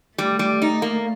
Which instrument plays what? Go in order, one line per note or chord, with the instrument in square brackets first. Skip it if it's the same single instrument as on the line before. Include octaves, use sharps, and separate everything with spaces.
[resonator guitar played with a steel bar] G3 [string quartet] A3
[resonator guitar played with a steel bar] G3
D#4
A#3